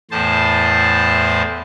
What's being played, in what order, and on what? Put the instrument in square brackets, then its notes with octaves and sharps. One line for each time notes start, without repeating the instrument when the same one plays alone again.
[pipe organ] E2 A2 C5 A5